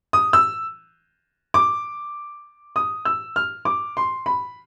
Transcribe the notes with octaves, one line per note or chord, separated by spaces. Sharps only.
D#6
E6
D6
D#6
E6
F6
D6
C6
B5